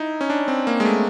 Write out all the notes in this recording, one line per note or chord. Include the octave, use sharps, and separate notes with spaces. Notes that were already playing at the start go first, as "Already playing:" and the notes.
Already playing: D#4 E4
C#4
D4
C4
A#3
G#3
A3